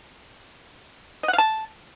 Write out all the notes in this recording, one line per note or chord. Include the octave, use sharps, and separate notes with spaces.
D#5
F#5
F5
A5